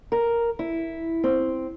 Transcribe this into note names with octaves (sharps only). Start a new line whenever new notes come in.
A#4
E4
C4